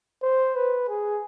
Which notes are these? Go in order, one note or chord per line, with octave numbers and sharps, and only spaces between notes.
C5
B4
G#4